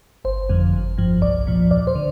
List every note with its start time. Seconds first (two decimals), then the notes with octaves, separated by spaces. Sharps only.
0.25 G1 C5
0.49 F2 D3 F3
0.73 G1
0.98 G2 F3
1.22 C2 D5
1.47 A#2 F3
1.70 D#2 D5
1.87 C5
1.95 D3